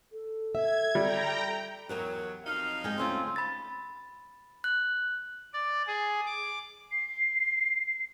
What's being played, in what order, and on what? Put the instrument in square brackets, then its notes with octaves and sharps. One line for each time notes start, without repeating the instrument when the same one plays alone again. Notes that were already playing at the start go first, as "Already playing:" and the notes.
[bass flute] A4
[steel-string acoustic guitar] E5 [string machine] G#6
[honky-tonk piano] G3 [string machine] G5 A#5
[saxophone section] E2 F#3 [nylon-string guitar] G4 A#4 C#5
[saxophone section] F2 F#3 D#4 [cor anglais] F5
[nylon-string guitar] G#3 G5
[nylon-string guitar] D2 C#4 F4 [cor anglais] C4
[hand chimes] B5 A6
F#6
[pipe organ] D5
G#4
D6
[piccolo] C7